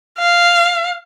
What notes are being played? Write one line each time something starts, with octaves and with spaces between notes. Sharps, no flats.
F5